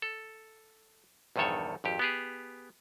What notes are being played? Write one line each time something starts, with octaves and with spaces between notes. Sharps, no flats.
A4
A#1 E2 G2 D#3 A4 C#5
G#1 F2 G4
B3 G4 G#4